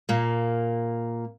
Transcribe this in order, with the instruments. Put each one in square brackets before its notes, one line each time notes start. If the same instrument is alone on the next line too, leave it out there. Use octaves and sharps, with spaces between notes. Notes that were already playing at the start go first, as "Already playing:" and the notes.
[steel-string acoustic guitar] A#2 A#3